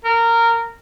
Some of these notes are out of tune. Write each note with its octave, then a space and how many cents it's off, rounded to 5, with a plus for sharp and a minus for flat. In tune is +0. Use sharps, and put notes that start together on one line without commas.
A#4 -15